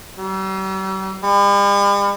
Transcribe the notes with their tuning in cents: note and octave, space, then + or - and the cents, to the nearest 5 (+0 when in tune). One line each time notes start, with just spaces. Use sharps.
G3 -45
G3 +45